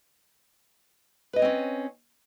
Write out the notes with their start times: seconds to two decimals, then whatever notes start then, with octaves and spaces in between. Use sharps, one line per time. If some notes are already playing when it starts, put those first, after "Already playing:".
1.33 B4
1.36 D#5
1.39 C#5
1.42 C4
1.45 C#4